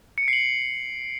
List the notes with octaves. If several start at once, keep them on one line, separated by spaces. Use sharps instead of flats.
C#7
D7
C7
F#7